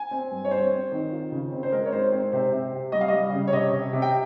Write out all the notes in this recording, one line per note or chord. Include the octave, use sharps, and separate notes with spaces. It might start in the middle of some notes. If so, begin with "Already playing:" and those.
Already playing: G#5
C4
G2
C#5
C4 C5
C4
D#3
F4
C#3
C4
C5
G#3 A#4
C#5
G#2 C5
C4
C3 C5
C3
C3
G3 D#5
F5
G3 D#5
C#3
C#5
C3 D#5
C3
C3
G5